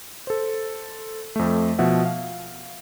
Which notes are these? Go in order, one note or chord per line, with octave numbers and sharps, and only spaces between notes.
A4 C5
F2 A3
B2 F3 E5 F#5
F5